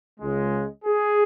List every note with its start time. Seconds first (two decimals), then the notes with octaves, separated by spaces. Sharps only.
0.19 C#2 C#3 G#3
0.84 G#4